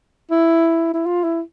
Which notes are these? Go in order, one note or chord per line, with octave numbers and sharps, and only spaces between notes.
E4
E4
F4
E4